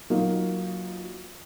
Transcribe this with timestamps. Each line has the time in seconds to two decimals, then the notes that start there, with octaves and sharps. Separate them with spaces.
0.10 F#3 A#3 D#4 F4